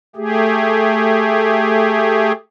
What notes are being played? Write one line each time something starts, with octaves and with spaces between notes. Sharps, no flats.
A3 G4 G#4